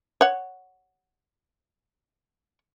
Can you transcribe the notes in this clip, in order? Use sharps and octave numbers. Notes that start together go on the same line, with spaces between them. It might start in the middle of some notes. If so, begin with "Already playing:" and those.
C#5 F#5